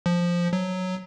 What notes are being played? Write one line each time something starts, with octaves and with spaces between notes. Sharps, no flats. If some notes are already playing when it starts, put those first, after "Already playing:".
F3
F#3